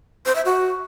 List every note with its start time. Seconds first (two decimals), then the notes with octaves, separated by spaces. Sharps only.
0.26 C5
0.35 E5
0.45 F#4